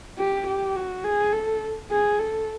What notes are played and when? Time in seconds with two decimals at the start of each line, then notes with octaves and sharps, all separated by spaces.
0.18 G4
0.47 G4
0.76 F#4
1.04 G#4
1.33 A4
1.90 G#4
2.19 A4